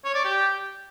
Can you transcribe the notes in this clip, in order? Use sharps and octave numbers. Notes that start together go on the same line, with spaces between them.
C#5
D5
G4